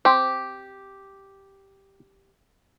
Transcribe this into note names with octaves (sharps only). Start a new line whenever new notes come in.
C4 G4